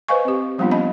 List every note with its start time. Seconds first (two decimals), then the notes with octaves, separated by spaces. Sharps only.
0.08 B4 C5 D#5 F5 G#5 C#6
0.25 C4 G4
0.58 F3 G3 A#3 B3 D4 F4
0.71 A#3 C#4 D#5 B5